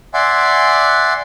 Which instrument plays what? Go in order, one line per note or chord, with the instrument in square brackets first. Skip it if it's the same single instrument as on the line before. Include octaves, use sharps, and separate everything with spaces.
[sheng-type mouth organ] D5 E5 F#5 G#5 C6 D6